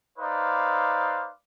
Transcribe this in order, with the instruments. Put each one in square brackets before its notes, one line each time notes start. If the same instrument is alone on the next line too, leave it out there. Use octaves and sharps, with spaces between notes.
[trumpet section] D#4 B4 C5 D5 F5